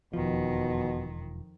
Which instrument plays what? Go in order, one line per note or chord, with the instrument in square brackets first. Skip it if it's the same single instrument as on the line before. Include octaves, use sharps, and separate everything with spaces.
[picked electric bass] E1 F3 [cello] F2 D#3 [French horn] B2